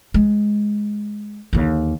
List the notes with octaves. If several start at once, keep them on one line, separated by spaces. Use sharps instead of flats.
G#3
D#2 D3